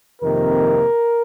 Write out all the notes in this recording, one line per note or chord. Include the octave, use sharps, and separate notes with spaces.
F2 C3 D#3 A#3 A#4